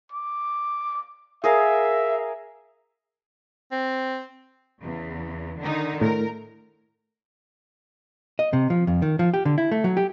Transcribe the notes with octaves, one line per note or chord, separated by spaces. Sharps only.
D6
G#4 A#4 E5 F5
C4
E2 C#3
D3 D#3 D#4
A2 A#4
D#5
C3
F3
F2
D#3
F3
G4
D3
E4
A3
F#3
G4